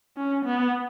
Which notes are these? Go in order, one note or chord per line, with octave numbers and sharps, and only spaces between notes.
C#4
B3